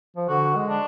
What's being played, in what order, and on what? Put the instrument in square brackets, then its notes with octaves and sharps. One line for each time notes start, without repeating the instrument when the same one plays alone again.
[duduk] F3
[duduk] D3 [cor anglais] F#4
[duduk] G#3
[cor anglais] D4